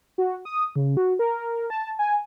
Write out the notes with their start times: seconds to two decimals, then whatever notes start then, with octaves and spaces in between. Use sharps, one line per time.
0.18 F#4
0.45 D#6
0.76 C#3
0.97 F#4
1.19 A#4
1.70 A5
1.99 G#5